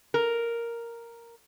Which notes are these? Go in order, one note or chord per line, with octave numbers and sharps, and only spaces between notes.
A#4